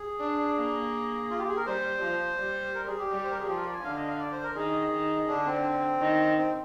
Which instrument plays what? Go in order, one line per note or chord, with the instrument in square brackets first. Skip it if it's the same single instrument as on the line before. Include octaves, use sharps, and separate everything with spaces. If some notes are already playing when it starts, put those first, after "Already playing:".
Already playing: [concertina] G#4
[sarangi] D4
A#3
[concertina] F4
G4
G#4
A#4
[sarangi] G3 [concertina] C5
[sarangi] F3
G3
[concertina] A#4
G#4
G4
[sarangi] G3
[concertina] C5
A#4
G#4
[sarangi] F3 [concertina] G4
[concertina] A#4
D5
G#5
[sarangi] D3 [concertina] F5
[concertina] D#5
F5
D5
C5
A#4
[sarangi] D#3 [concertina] G#4
[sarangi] D#3
[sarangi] D3 [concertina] D4
[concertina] C4
[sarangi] D#3
[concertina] C4